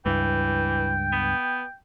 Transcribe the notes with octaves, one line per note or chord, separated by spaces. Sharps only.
C#2 G2 E3 G5
B3